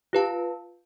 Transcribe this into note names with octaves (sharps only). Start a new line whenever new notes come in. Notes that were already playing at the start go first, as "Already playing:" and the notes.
F4 G4 B4 F5 A5